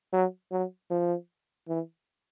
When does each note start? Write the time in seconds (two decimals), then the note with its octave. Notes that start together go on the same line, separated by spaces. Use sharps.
0.13 F#3
0.52 F#3
0.90 F3
1.68 E3